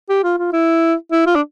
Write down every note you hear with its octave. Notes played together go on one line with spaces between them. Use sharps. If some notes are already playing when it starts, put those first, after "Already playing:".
G4
F4
F4
E4
E4
F4
D4